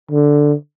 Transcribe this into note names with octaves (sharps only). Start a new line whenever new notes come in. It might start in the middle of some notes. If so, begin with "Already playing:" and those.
D3